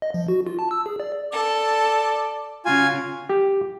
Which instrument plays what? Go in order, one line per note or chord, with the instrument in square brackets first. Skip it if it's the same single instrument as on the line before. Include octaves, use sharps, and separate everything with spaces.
[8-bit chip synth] D#5
F3
F#4
F4
A5
E6
G#4
D5
[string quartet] A4 [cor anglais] D5
[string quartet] C#3 [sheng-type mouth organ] F4 G#5 [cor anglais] F#4
[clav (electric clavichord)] G4